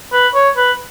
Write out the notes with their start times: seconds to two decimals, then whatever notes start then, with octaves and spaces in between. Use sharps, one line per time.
0.12 B4
0.34 C#5
0.57 B4